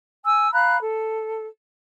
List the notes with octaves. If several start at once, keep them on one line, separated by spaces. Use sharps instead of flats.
G#5 E6
F5 A#5 B5 F#6
A4